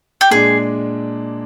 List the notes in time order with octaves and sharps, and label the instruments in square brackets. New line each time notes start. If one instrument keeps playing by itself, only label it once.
[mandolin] G4
[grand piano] A#2 G#3 D4 [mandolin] G#4